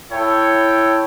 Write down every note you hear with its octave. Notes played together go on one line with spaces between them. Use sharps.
E4 A4 C#5 G5